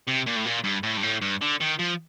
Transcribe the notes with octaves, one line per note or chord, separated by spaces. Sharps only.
C3
A#2
A2
A#2
G2
A2
G2
A2
G2
D3
D#3
F3